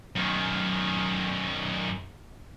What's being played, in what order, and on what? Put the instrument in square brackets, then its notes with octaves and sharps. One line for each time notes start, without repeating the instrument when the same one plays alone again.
[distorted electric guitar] F#2 D#3